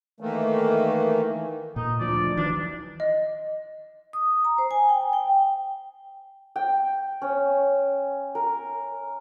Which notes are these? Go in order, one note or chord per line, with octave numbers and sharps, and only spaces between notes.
D#3 E3 A3 A#3
A#2 D#4
D2 F3 D5
D#3 E3 F#3 D4
D#5
D#6
A#5
C5
G#5
G5
G5
G5
C#4
A#4